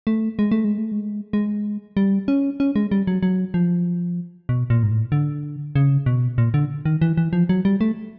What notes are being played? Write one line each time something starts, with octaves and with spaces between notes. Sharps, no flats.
A3
G#3
A3
G#3
A3
G#3
G#3
G3
C#4
C#4
G#3
G3
F#3
F#3
F3
B2
A#2
G#2
A2
D3
C#3
B2
A#2
D3
D#3
E3
E3
F3
F#3
G3
A3